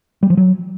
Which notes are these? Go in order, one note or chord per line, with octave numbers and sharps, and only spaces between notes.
G3
F3
F#3